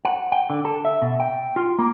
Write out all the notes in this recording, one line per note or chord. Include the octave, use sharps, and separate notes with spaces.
F#5
G5
D3
A4
E5
B2
G5
F4
A#3